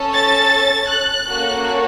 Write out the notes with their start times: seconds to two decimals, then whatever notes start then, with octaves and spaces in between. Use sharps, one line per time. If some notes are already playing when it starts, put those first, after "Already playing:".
Already playing: C#4 A4
0.15 A6
0.90 F#6
1.28 A#3 C#4 F#4 A4